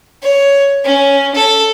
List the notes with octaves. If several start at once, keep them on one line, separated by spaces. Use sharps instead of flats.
C#5
C#4
A4